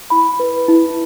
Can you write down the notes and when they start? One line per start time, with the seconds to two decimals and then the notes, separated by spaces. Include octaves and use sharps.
0.10 E4 B5
0.40 B4
0.68 E4